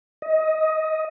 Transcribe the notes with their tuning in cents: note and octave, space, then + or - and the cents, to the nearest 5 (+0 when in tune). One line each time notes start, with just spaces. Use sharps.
D#5 +20